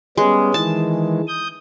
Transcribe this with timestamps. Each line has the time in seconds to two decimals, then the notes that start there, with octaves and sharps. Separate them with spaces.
0.17 G3 G#3 B3 C#4
0.54 D#3 E3 G#3 A5
1.28 D#6 G6